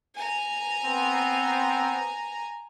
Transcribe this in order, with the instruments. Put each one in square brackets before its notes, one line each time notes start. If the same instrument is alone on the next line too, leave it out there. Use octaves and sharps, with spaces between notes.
[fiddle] G#5 A#5
[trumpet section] B3 C4